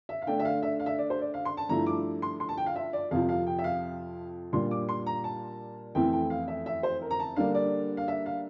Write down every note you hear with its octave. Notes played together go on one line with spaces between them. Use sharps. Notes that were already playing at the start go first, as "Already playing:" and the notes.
E5
F5
D3 A3 D4 G5
E5
F5
E5
F5
E5
D5
C5
D5
F5
C6
A5
G2 F3 A3 E4 A#5
D6
C6
C6
A5
G5
F5
E5
D5
F2 C3 F3 F5
F5
G5
E5
F5
A#2 G3 D4 F4 C6
D6
C6
A#5
A5
F2 E3 A3 C4 E4 G5
G5
F5
E5
E5
C5
A#4
A#5
A5
D3 G3 A#3 D4 F5
D5
F5
E5
F5